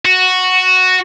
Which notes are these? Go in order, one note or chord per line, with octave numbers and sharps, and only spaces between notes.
F#4